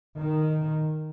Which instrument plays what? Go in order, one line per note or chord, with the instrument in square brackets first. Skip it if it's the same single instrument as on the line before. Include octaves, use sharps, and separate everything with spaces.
[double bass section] D#3